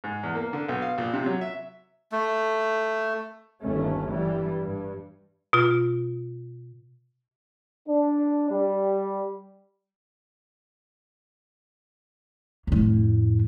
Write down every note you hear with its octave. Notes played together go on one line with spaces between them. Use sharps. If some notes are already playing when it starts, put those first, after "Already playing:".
G#2
E2
A#3
D3
B1
F5
A#1
C3
F#3
E5
A3
G1 D#2 A3 C#4
G2 E3 G3
G2
B2 F4
D4
G3
F2 A2